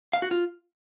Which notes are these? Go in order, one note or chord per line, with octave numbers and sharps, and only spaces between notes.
F5
F#4
F4